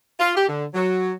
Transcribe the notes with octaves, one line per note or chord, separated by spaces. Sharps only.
F4
G4
D3
F#3